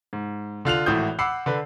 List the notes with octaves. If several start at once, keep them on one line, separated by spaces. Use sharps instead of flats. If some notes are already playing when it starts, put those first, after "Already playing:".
G#2
D3 F4 F#6 F7
G#1 A2 E3 F#4 D#6 G6
F#5 B5 D6 E6 C7
D3 B4